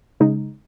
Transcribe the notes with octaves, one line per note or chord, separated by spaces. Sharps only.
C#3 G#3 D#4